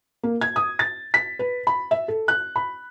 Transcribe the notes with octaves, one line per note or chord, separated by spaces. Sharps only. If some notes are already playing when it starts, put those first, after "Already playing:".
A#3
G#6
D#6
A6
B6
B4
B5
E5
A4
F#6
B5